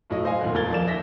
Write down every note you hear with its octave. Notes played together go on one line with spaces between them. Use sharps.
B1 A2 F#3 D#5
C5 D#5 F5 G#5
E1 C#2 A#2 F#4
D#1 A#2 A#4 G#6 A6 G7
F3 D5 E7
D#2 E5 A#6 B6